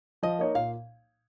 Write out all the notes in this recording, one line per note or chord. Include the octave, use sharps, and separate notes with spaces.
F3 D#5
A#3 D#4 C#5
A#2 F5